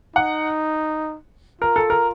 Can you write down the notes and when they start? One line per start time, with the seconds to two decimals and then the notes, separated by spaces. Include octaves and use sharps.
0.15 D#4 F#5
1.61 F4 A#4
1.76 A4
1.90 A#4